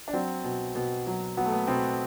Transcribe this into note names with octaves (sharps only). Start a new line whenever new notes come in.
D4
F#3 C4
B2
B2
F#3
F#3 B3
A3
B3
B2 C4